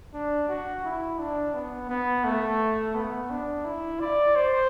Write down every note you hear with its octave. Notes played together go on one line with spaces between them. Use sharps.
D4
F#4
E4
D4
B3
B3
A3
B3
D4
E4
D5
C5